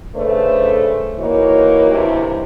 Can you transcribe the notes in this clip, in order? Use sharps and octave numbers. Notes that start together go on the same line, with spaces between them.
C#3 A3 D4 B4 C5
E3 A#3 D#4 F#4 C#5
G2 C3 D#3 E3 E4 C5